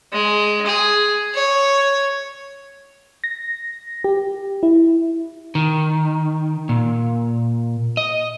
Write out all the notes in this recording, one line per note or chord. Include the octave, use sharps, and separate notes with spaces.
G#3
G#4
C#5
A#6
G4
E4
D#3
A#2
D#5